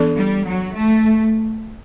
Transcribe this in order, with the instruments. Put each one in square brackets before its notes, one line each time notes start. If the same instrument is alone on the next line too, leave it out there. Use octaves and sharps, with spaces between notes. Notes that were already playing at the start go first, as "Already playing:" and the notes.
Already playing: [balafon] E3 B3 D4 A4 D5
[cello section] G3
F#3
A3